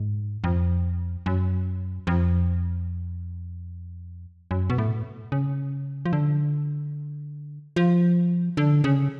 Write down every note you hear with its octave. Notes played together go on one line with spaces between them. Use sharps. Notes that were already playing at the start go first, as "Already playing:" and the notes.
Already playing: G#2
F2
F#2
F2
F#2
B2
A2
C#3
F3
D3
F3
D3
C#3